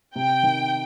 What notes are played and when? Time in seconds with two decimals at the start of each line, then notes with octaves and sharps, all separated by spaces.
0.15 C3 G5
0.43 D#3